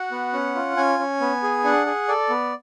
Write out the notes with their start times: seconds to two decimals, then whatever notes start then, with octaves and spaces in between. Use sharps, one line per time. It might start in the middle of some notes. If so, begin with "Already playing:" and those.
Already playing: F#4 F#5
0.11 B3
0.33 C#4
0.55 F4
0.77 C#4 G#5
0.99 C#4
1.21 B3
1.43 G#4
1.64 D4 F#5
1.86 G#4
2.08 A4 D5
2.30 B3